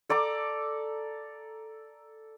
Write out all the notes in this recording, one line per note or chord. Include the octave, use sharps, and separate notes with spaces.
A4 D5 A#5 D6